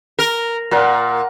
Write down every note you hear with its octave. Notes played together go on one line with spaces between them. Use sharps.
A#4
A#2 A#4 F5 F#5